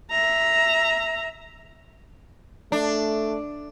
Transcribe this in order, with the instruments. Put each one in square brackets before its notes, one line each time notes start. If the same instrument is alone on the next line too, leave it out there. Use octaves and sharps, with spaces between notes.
[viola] E5 A#5
[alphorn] A3 [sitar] D4